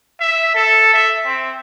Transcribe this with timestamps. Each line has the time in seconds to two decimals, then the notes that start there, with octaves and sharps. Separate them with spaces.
0.20 E5
0.55 A4
0.93 E5
1.25 C4